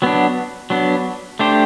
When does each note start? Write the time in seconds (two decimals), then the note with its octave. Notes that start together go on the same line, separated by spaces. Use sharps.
0.02 F#3 B3 D4
0.70 F#3 B3 D4
1.39 A3 D4 G4 C5